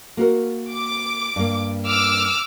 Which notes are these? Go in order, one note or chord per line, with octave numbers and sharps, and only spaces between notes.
A#3 F#4 A#4
D6
G2 A#3
D6 E6 F6